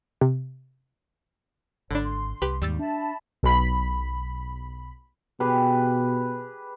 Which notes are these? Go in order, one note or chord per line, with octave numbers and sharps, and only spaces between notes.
C3
G#1 D3 D4 C#5 B5
C6
C2 G4 B4
D#2 G#2 G3 E6 A6
D4 E5 A5 B5
B1 B5
B2 G4 G#4 B4